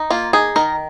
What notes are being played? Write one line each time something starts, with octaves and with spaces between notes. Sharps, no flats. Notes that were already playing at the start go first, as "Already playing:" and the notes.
Already playing: D#4
A#3 F4
D#4 G#4
D#3 A#4